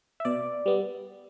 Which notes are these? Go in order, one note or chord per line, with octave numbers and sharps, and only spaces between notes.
E5
B2 D5
G3 B3